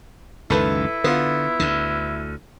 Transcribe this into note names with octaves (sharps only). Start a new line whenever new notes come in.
C#2 F#2 D#3 E4 A4 B4
D3 B3 F4
D2 D3